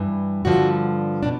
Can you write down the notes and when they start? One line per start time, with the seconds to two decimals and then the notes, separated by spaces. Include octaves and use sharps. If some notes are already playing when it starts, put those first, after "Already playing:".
Already playing: G2 E3
0.45 G2 D3 F3 F#4
1.23 B2 D4